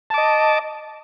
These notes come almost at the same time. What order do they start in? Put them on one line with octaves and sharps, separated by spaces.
A5 D6 D#5